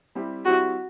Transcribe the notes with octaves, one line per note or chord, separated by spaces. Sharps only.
G3 C4 E4 G4
G3 C4 E4 F#4 G4